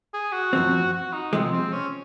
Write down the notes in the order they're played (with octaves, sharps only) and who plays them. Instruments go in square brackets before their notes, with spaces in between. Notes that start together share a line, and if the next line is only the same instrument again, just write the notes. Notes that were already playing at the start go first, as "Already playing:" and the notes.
[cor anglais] G#4
F#4
[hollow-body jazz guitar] F#2 F3 C4
[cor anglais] F#4
D#4
[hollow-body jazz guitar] C3 F3 G#3 [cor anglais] C4
[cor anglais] C4
C#4